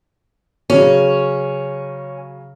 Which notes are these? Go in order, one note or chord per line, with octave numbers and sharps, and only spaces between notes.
C#3 F#3 C#4